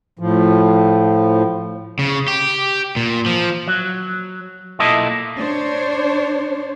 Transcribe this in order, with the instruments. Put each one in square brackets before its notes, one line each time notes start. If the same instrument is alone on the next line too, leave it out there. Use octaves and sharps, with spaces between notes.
[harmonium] A2 F3
[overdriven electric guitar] C#3
G4
A#2
F3
[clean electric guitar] F#3
B1 A#2 A#3 E4 A4 D#5
[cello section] D4 C5 C#5